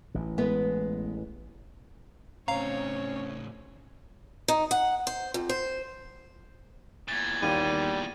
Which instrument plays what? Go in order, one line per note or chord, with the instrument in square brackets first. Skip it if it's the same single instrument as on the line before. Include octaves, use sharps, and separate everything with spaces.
[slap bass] A1 E3
[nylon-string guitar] G#3 B3 B4
[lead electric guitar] A2 C#3 [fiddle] C4 C#5 [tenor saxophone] C#4 [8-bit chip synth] F5 A#5
[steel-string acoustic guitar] D#4
F#5
C5
F2
C5
[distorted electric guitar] E2 A#2 [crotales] G#6 A6
[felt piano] D#2 [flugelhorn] G3 [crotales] D#7